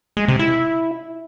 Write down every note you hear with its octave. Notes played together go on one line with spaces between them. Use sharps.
G#3
C3
E4